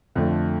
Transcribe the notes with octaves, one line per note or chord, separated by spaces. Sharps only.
F2 D3 A3